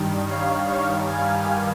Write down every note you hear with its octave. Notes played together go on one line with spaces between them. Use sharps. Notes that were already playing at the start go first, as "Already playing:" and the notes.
Already playing: G2 D#3 G3
C#5 F5
C#5 F5
F5 G#5